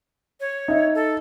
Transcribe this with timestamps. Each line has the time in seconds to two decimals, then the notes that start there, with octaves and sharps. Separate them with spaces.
0.40 C#5
0.68 D#4 E5
0.95 A4